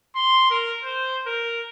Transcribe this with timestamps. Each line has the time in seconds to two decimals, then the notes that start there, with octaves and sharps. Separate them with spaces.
0.16 C6
0.50 A#4
0.84 C5
1.26 A#4